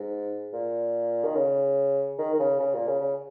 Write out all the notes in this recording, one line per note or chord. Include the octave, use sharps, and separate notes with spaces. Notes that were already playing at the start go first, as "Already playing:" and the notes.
Already playing: G#2
A#2
D#3
C#3
D#3
D#3
C#3
C#3
A#2
C#3
C#3